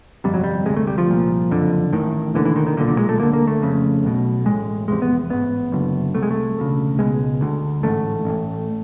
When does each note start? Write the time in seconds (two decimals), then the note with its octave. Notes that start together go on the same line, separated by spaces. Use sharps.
0.24 G1 F2 C3 G3
0.34 F#3
0.44 G3
0.66 D2 C3 G#3
0.77 A3
0.87 G3
0.98 F3
1.08 C2 A#2
1.50 F#1 F2 D3
1.93 A1 A2 D#3
2.35 E1 D#2 D3 E3
2.45 E3
2.56 D#3
2.67 D#3
2.77 B1 D3
2.80 A#2
2.88 D3
2.99 G#3
3.09 A3
3.19 D2 D3 A#3
3.33 A#3
3.47 A3
3.61 F1 F2 C#3
4.04 B1 B2
4.46 A1 A2 G#3
4.88 F1 E2 C3 G#3
5.02 B3
5.30 A1 G#2 B3
5.72 F#1 F#2 D3
6.14 C2 C3 A3
6.23 G#3
6.31 A3
6.56 E1 D2 C#3
6.99 C#2 B2 G#3
7.41 D2 D3
7.83 A1 G#2 A3
8.25 A1 A2